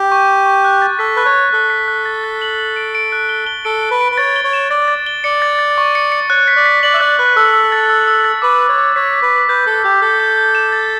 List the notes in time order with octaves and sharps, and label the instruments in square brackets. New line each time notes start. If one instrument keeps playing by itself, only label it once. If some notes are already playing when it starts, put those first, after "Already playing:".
Already playing: [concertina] G4
[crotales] C#6
C#6
C#6
F#6
A6
[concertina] A4 [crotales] B6
[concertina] B4 [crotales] F#6
[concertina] C#5
[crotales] F#6
[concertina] A4 [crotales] F#6
[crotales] B6
F#6
A6
A6
F#7
F#7
D7
D7
F#6
G7
G7
[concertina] A4 [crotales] D7
[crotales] D7
[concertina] B4
[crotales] D7
[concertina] B4
[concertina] C#5 [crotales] A6
[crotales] G7
[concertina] C#5
[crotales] E7
[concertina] D5 [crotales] A6
[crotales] A6
G7
[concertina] D5 [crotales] C#7
[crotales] A6
A6
C#6
C#7
C#7
[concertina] C#5 [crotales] F#6
[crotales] B6
[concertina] D5
[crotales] B6
[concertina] D5 [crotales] F#7
[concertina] E5
[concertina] D5 [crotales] F#6
[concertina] B4 [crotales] F#6
[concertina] A4 [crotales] E6
[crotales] E6
A6
E6
E6
A6
[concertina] B4 [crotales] D6
[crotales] D6
[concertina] C#5
[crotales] D6
[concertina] C#5 [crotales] B6
[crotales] B6
[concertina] B4
[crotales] B6
[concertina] B4 [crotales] G6
[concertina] A4 [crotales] G6
[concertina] G4 [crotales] G6
[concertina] A4 [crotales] G6
[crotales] G6
G6
E7
A6